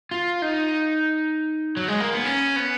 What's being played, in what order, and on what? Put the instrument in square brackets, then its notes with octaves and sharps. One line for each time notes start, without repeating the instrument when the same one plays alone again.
[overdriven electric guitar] F4
D#4
F#3
G#3
A#3
B3
C#4
B3